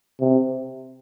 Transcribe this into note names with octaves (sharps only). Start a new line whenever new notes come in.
C3